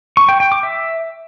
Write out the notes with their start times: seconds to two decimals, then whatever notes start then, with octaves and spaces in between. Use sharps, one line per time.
0.17 C#6
0.29 G5
0.40 G5
0.52 D6
0.63 E5